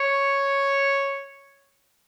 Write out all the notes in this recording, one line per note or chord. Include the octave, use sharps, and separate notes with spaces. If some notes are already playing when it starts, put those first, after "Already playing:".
Already playing: C#5